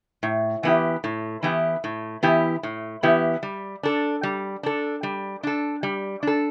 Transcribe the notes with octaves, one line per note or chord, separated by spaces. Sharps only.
A2
E3 B3 E4 G4
A2
E3 B3 E4 G4
A2
E3 B3 E4 G4
A2
E3 B3 E4 G4
G3
D4 A4
G3
D4 A4
G3
D4 A4
G3
D4 A4